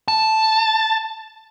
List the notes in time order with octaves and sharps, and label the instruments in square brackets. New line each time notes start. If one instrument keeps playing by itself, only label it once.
[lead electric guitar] A5